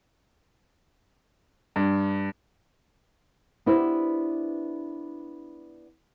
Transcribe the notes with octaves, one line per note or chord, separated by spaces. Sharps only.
G2
B3 D4 E4 G4 C5